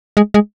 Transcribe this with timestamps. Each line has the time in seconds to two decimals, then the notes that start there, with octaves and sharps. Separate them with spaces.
0.17 G#3
0.34 G#3